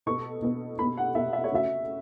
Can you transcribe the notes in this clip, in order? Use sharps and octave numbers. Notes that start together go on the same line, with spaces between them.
B2 B3 A4 C#6
B2 B3 A4
B2 B3 A4 B5
F#5
B2 B3 A4 E5
E5
C#5
C#3 A3 F#4 E5